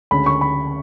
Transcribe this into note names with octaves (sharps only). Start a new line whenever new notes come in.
D2 C#3 G#3 C#4 B5
C#6
B5